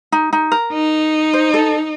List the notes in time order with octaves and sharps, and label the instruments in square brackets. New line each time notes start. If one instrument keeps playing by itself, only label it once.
[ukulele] D#4
D#4
A#4
[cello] D#4
[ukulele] C5
A4